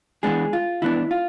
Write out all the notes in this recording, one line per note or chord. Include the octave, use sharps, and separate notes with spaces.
E3 G#3 B3 D4 G#4
F4
E3 B3 D4 E4
F4